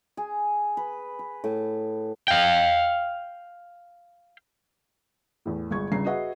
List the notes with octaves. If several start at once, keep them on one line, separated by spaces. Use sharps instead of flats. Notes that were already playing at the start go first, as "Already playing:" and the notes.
G#4
B4
B4
A2
F5 G5
E2 A2
G1 G#3 C#6 G#6
G1 G2 C#3 A#5 C7
F#4 G#4 B4 D#5 E5 F#5